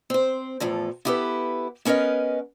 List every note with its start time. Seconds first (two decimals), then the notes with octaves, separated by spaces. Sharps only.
0.10 C4 C5
0.60 E2 A2 F3 A4
1.05 B3 E4 G4 A4 B4
1.85 B3 C#4 A#4 B4 D#5